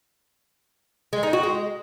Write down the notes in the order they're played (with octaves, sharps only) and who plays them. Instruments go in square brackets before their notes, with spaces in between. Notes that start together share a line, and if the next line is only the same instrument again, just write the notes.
[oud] G#3
D#4
F#4
G#3